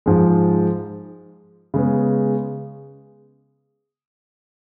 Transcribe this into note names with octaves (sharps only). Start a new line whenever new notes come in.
G#2 F3 G#3
C#3 G#3 B3